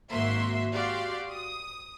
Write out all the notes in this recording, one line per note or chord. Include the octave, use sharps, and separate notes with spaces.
G#1 G#2 A#3 F#4 E5 C6
F#4 G4 D5 F5 C6
D#6